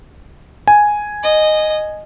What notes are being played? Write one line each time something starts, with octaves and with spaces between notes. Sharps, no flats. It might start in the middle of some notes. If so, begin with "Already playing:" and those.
G#5
D#5